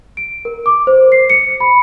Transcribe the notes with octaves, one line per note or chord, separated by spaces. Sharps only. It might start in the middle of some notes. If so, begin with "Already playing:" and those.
D7
A#4
D6
C5
C7
C#7
B5